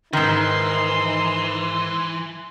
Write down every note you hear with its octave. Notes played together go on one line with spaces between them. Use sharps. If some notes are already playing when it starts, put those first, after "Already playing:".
G#2 D#3 E3 D#4 C6